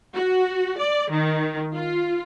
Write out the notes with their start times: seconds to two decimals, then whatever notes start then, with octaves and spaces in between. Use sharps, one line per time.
0.15 F#4
0.80 D5
1.12 D#3
1.75 F4